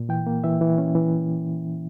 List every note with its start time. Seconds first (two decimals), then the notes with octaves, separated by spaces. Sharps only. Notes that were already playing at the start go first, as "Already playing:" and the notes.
Already playing: A#2
0.09 E3 G5
0.27 A#3
0.44 E3 E5
0.61 E3
0.78 C#4
0.95 E3